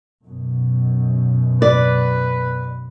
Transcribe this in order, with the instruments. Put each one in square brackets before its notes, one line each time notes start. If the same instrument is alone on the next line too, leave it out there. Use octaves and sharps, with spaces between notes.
[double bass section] F#2 B2
[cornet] B4 [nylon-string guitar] D5